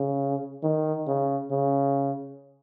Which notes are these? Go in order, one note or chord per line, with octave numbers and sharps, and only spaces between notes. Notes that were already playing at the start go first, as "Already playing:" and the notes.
Already playing: C#3
D#3
C#3
C#3